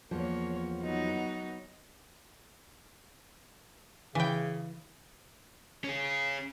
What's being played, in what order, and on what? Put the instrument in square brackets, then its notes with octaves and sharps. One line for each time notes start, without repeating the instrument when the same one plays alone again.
[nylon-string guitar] E2 F3 [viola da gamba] A#3 C#5
[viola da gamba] F#3 B3 D#4
[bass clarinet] C#3 [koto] E3 G5
[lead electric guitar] C#4 G#4